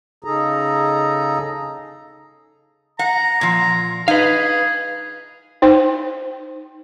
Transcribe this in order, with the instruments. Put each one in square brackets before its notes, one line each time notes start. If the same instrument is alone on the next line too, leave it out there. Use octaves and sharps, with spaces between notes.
[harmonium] C#3 D#4 G#4 A4 A#5
[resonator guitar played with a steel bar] F#5 [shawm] A#5
[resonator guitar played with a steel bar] A#2 F3
[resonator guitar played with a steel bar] D#4 [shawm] G#4 [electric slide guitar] B4 F5
[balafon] D#4 C5 G5